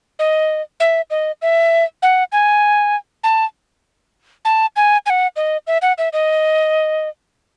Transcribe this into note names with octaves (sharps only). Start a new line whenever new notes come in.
D#5
E5
D#5
E5
F#5
G#5
A5
A5
G#5
G#5
F#5
D#5
E5
F#5
E5
D#5